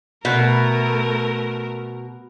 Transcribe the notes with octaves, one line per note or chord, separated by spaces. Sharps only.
B2 A3 A#4